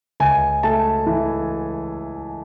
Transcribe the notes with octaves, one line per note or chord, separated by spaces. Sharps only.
C#2 G#5
A3 A5
E3